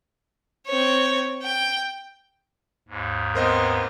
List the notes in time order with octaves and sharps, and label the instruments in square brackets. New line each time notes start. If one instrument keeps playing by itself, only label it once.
[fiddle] C4 C#5
G5
[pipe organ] D#2 G#2
[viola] B3 C4 [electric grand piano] A#4 C5 D#5